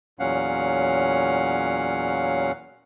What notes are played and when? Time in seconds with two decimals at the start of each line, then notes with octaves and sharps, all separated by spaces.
0.19 E2 A#2 F#3 C#4 F5 F#5